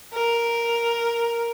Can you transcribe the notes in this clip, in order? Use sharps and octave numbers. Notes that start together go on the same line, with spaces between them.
A#4